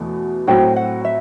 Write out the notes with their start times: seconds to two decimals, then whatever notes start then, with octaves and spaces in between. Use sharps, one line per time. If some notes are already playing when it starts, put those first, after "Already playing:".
Already playing: E2 B2 A3
0.47 A2 F#3 A3 C4 F#4 G5
0.76 F#5
1.05 E5